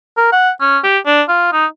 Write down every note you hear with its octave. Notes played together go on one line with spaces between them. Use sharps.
A#4
F#5
C#4
G4
D4
F4
D#4